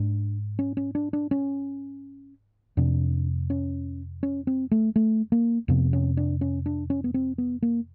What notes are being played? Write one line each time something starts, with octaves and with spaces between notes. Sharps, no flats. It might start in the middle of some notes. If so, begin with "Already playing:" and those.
Already playing: G#2 D4
C#4
C#4
D4
D4
C#4
F2 C3 D4
C#4
C#4
C4
A3
A3
A#3
F2 C3 B3
C#4
D4
C#4
D4
C#4
B3
C4
B3
A#3